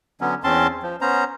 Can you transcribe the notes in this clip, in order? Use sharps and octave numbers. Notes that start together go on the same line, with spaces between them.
D3 F#3 B3 C#4
E2 C4 C#4 A5 C6
F3
B3 C#4 C5 A#5